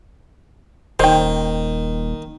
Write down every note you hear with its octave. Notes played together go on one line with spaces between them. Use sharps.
D#1 D#3 C5 G5